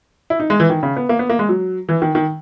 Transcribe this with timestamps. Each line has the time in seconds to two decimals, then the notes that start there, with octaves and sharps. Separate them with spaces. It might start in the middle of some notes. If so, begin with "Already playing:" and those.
0.30 E4
0.40 D#4
0.50 G#3
0.60 E3
0.70 D#3
0.83 C#3
0.96 B3
1.09 A#3
1.19 B3
1.30 A#3
1.39 G#3
1.49 F#3
1.89 E3
2.02 D#3
2.15 D#3